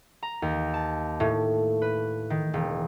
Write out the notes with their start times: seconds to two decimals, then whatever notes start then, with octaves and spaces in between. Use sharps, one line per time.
0.22 A#5
0.42 D#2
0.74 A5
1.20 A2
1.82 B4
2.30 D#3
2.54 E1